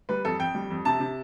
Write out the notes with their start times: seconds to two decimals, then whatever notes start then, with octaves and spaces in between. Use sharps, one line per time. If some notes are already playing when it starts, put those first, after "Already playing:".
0.09 G3 B4
0.25 F2 A4
0.39 F2 G5
0.55 G3
0.70 F2
0.85 C3 A5
1.00 C3